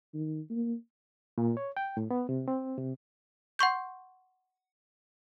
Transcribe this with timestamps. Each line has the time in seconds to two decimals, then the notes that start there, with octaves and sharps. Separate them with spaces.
0.14 D#3
0.50 A#3
1.38 A#2
1.57 C#5
1.77 G5
1.97 A2
2.11 B3
2.29 C3
2.48 C4
2.78 C3
3.59 F#5 C6 C#6 G6